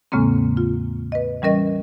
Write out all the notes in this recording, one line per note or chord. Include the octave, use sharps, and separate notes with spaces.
E2 A2 C#3 G#3 A#3 C4
F4
B4 D#5
E3 G3 C#4 A#4 D#5